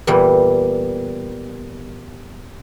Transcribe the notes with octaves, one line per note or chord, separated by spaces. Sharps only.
E2 A#2 E3 G3